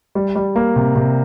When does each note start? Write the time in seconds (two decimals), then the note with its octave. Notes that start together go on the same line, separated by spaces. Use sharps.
0.15 G3
0.36 G3
0.56 A#3
0.76 C3
0.96 C3